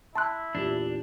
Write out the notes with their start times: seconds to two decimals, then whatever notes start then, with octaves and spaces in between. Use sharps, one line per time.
0.16 E4 A5 C6 F#6
0.55 E2 A#2 D4 G4